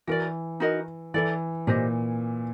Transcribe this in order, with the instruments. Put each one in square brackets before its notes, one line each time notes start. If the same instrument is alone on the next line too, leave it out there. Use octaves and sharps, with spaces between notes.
[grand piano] E3 [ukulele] F#4 A#4 D5
[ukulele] D#4 F#4 A#4 D#5
[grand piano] E3 [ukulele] E4 A4 D5
[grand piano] A#2 [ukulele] G4 C5 D#5